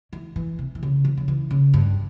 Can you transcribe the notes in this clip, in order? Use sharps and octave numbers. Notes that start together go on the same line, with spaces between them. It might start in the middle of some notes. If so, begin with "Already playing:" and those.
E3
E3
C3
E3
C#3
E3
C#3
E3
C#3
G2